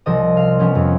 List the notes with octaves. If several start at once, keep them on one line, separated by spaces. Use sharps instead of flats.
C2 F3 G3 D#5 D#6
F5
F3 B3 C#4
F2